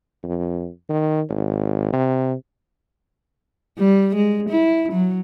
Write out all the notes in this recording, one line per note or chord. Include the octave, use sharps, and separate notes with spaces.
F2
D#3
G#1
C3
G3
G#3
E4
F#3